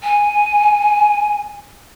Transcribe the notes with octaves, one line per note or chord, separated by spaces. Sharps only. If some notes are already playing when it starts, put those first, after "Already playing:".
G#5